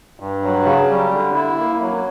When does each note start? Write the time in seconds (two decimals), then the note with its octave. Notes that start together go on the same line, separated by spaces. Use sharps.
0.20 G2
0.43 F#3
0.65 C#3
0.89 G3
1.12 D3
1.34 E4
1.58 A#3
1.80 F#3